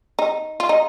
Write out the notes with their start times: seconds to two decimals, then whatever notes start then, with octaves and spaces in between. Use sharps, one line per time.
0.19 D#4
0.60 F4
0.69 D#4